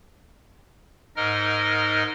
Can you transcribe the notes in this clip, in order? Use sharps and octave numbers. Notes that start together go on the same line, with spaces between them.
G#2 D#4 A#4 D#5 F6